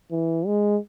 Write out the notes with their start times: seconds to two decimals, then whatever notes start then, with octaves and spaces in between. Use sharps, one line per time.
0.11 E3
0.46 G#3